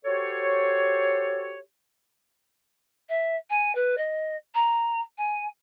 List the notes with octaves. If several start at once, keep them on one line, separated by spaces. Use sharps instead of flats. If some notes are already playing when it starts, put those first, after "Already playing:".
F#4 G4 A4 C5 C#5
E5
G#5
B4
D#5
A#5
G#5